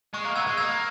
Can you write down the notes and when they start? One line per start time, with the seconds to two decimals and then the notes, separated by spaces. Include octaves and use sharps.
0.14 G#3 C#6
0.25 A#3
0.35 B3 E6 G#6
0.47 G#3
0.57 A#3 E6 G#6